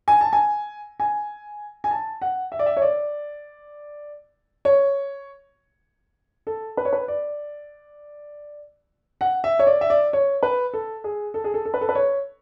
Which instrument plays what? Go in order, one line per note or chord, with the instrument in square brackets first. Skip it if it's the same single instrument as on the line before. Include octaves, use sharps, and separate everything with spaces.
[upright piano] G#5
A5
G#5
G#5
G#5
A5
F#5
E5
D5
E5
C#5
D5
C#5
A4
B4
C#5
B4
D5
F#5
E5
C#5
D5
E5
D5
C#5
B4
A4
G#4
A4
G#4
A4
A4
B4
A4
B4
C#5